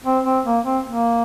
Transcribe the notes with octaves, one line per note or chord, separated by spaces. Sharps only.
C4
C4
A#3
C4
A#3